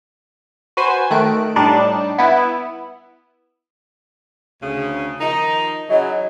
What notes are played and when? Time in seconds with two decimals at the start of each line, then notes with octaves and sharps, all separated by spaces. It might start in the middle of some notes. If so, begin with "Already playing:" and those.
0.77 F#4 B4 C5 G#5
1.11 D#3 A3 F#6 D7
1.56 A2 G3 D4 D#4 D5 A5
2.18 B3 E4
4.62 D2 C#3
5.20 D#3 F3 D#4
5.90 C#3 E3 F#3 D#5